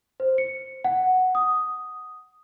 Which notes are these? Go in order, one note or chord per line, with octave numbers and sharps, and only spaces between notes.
C5
C#7
F#5
D#6